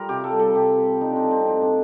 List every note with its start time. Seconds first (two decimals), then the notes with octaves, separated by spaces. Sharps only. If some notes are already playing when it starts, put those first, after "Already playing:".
Already playing: G3 F4 A#4
0.09 C3 G4
0.24 A4
0.32 G3
0.40 A4
0.55 C3 G4
0.78 G3
1.00 A3 D#4
1.11 C4 D4
1.24 F3
1.31 C4
1.47 A2 C4
1.62 D4